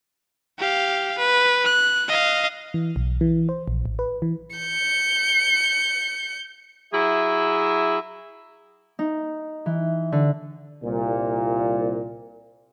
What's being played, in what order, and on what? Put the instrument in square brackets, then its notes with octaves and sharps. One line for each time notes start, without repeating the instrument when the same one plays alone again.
[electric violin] G4 F5
B4
F#6
D#5 F5
[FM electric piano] E3
B1
E3
C5
A#1
A1
B4
E3
[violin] G6 C#7
[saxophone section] F#3 E4 G#4 E5
[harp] D#4
E3
D3
[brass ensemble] C2 A#2